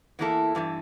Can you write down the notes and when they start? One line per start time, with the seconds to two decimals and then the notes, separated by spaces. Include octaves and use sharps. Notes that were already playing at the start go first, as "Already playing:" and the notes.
0.19 E2 E3 A#3 E4 A4
0.55 G2 E3 A3